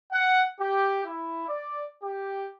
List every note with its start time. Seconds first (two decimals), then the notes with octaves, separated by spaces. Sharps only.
0.11 F#5
0.59 G4
1.05 E4
1.48 D5
2.02 G4